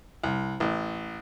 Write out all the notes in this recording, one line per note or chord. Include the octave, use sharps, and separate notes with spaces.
C2
A1